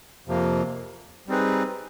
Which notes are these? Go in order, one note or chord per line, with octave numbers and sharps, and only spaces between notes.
F2 C3 F3 A#3
G3 C4 D#4 G#4 B4